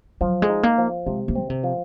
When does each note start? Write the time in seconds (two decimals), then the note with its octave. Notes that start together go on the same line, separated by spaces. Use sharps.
0.21 F3 F#3
0.42 G#3
0.49 D#4
0.63 A#3
0.78 F3
1.06 C3 G#3
1.28 A#3
1.35 C4
1.41 C#3
1.50 C3
1.64 F3